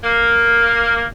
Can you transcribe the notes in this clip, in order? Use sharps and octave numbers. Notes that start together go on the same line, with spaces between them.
A#3